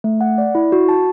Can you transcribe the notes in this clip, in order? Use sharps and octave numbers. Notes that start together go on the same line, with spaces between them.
A3
F#5
D5
E4
F#4
A5